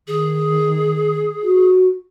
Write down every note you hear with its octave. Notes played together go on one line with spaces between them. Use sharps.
D#3 G#4
F#4